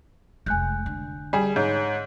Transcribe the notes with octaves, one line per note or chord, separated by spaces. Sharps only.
F1 G#3 G#5 F#6 G6
D3
G3 G#4
G#2 C#5 G6